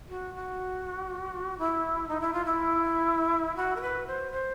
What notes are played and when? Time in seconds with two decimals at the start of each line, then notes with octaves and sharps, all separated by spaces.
0.09 F#4
0.34 F#4
1.58 E4
2.08 D#4
2.21 E4
2.33 F4
2.45 E4
3.56 F#4
3.76 A#4
3.81 B4
4.07 C5
4.32 C5